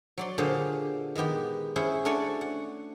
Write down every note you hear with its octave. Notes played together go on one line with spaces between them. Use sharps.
F#3 D5 C6
A#2 D3 G4 G#4 C5 F5
D#3 G#3 B3 G4 G5
C#4 E4 G#4 C5 F#5
A3 D4 F#4 C#5 D5 G#5
F#5